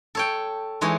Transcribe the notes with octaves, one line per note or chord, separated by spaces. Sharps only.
A4 C#5 G5
E3 G#3 D#4 C#5